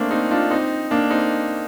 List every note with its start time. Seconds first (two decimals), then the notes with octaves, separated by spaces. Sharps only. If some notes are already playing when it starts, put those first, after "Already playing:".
Already playing: A3 A#3 C4 D4
0.11 C4 D#4
0.31 D4 F4
0.51 C4 D#4
0.91 A#3 D4
1.11 C4 D#4